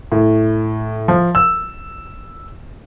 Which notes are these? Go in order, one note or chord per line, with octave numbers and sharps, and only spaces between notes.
A2
F3
E6